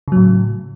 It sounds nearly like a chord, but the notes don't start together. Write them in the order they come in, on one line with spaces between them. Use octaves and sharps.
C#3 F#3 A2